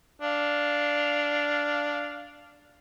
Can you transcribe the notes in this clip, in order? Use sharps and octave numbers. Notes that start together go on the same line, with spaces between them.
D4 F5